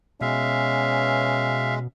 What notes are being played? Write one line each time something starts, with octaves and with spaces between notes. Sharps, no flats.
B2 G#3 C#4 E5 F5